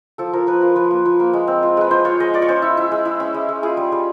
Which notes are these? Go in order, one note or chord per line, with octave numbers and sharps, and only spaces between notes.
F3 A4
F3 A#4
F3 B4
F4 A#4
F3 B4
A#3
F3
A#3
G#3
C4
F4
G#3 B4
F4 C5
F4 C#5
G#3 D#5
F4 D5
C#5
C#4 C5
E4
E4
G#3
E4
C#4
G#3
G#3
F4 G#4
G3
G3